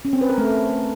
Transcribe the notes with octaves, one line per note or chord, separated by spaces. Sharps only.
C#4
C4
B4
A#4
A3